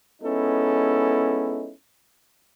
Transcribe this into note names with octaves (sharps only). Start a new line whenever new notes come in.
G#3 B3 C#4 D#4 E4 A4